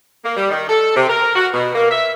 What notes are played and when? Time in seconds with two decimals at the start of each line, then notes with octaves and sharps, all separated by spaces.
0.25 A#3
0.36 G3
0.50 D#3
0.69 A4
0.96 C3
1.10 A#4
1.36 F#4
1.54 B2
1.75 A#3
1.91 E5